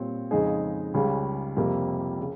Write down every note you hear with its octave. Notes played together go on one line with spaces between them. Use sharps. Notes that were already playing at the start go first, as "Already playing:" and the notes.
Already playing: A#2 G3 C4 G4 C#5
F2 C#3 G#3 D#4 G#4
C#2 C#3 G3
F2 C3 G3 A#3 F4
C#3